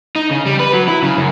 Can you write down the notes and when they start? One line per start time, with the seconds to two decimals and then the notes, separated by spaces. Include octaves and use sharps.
0.16 D#4
0.31 C#3
0.46 G3
0.60 B4
0.73 F#3
0.88 E4
1.03 C#3
1.17 F#2